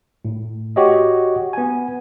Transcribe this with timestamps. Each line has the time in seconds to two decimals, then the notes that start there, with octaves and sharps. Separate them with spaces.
0.25 A2
0.76 F#4 G4 C#5 D#5
1.53 B3 G#5